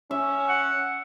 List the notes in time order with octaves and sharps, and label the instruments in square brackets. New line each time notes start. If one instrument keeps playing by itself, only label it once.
[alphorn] C#4 [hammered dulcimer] E5
[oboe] F#5